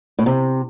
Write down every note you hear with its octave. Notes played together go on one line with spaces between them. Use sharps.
A2
C3